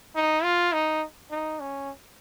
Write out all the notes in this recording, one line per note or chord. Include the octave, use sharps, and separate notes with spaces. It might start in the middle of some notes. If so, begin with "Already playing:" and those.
D#4
F4
D#4
D#4
C#4